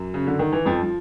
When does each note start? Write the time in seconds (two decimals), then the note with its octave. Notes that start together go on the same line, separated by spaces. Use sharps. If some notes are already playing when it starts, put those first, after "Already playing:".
Already playing: F#2 F#3
0.14 C#3
0.27 D3
0.39 D#3
0.52 E3
0.66 F2 F3
0.83 F3